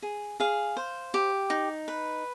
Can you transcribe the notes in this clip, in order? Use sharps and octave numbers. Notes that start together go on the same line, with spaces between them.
G#4
G#4 F5
C5
G4
D#4
B4